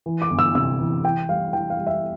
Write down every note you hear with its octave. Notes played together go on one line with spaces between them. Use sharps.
E3
D6
G1
E6
C3 E6
E3
E3 G5
G3 F5
E3 G5
F5
G3
E5